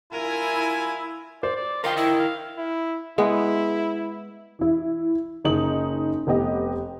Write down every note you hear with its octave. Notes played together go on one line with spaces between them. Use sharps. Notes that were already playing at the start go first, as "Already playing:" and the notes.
G2 E4 F4 A#4 G#5
C5 D5
D5
F4 A#4 D#5 F5 G5
E4 E5
F5
E4
G#3 B3 E4
E3 E4
F#1 D#4 F#7
F1 B3 G4 D#5